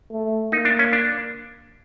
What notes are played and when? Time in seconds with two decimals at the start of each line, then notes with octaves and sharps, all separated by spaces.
0.11 A3
0.52 A#3 D#4
0.65 D4
0.79 C#4
0.93 D4